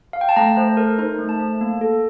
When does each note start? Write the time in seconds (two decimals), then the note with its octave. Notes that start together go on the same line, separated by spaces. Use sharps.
0.13 F5
0.21 G5
0.29 A5
0.36 A3 A#5
0.57 A3 C5
0.77 A4 A#4
0.99 D#4 C5
1.19 A3
1.29 A5
1.40 A3
1.61 A#3
1.81 A4